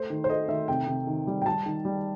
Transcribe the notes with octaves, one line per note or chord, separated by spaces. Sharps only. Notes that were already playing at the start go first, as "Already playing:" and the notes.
Already playing: A3 C5
D#3
C5
A3 D#5
D#3 E5
C3 G5
C3
D#3
G3
G5
G3 A5
D#3
G3